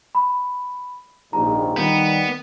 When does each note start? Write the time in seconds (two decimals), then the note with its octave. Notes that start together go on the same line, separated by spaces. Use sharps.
0.15 B5
1.33 A#1 D#2 G#2 A#5
1.77 D#3 G3 B3